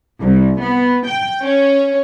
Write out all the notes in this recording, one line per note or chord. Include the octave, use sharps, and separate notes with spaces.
C2
B3
G5
C#4